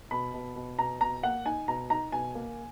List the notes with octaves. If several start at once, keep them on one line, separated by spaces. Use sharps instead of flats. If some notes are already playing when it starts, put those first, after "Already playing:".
B2 B5
B2
B2
B2 A#5
B2 A#5
A#3 F#5
D#4 G#5
B2 A#5
D#4 A#5
B2 G#5
A#3